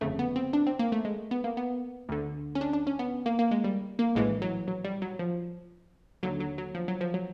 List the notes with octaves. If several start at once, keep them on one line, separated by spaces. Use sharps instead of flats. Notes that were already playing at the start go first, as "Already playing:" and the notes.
G1 F2 C#3 A3
B3
C4
D4
C4
A#3
A3
G#3
B3
A#3
B3
D2 D3
C#4
D4
D4
C#4
B3
A#3
A#3
G#3
G3
A#3
A#1 A2 E3 G#3
F#3
F#3
G3
F#3
F3
D#2 D3 F#3
F#3
F#3
F3
F#3
F3
F#3